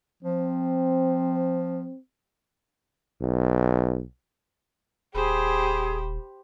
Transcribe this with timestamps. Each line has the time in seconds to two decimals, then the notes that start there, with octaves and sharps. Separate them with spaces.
0.23 F3 C4
3.21 B1
5.15 D#1 G4 G#4 C5 B5